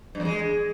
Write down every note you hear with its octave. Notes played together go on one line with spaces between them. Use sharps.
G2
E2
G#3